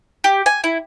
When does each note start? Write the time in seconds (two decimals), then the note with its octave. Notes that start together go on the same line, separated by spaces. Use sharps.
0.24 G4
0.46 G#5
0.64 E4